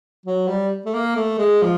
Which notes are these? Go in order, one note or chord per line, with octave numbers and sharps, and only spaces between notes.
F#3
G3
A3
A#3
A3
G#3
F3